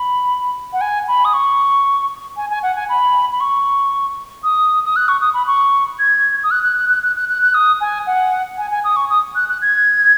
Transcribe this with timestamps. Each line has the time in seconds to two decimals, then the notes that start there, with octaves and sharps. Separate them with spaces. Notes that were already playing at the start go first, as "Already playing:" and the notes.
Already playing: B5
0.73 F#5
0.81 G#5
1.08 B5
1.25 D#6
1.34 C#6
2.37 G#5
2.50 G#5
2.63 F#5
2.76 G#5
2.89 B5
3.32 B5
3.40 C#6
4.44 D#6
4.85 D#6
4.96 F#6
5.08 C#6
5.21 D#6
5.34 B5
5.47 C#6
5.99 G#6
6.44 D#6
6.51 F#6
6.63 F#6
6.77 F#6
6.90 F#6
7.03 F#6
7.16 F#6
7.29 F#6
7.42 F#6
7.54 D#6
7.81 G#5
8.07 F#5
8.58 G#5
8.71 G#5
8.84 D#6
8.96 C#6
9.10 D#6
9.36 F#6
9.49 F#6
9.62 G#6